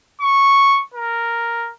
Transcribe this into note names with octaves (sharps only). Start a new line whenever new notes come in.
C#6
A#4